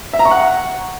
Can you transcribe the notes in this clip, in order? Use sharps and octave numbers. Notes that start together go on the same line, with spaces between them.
E5
A#5
C#6
F#5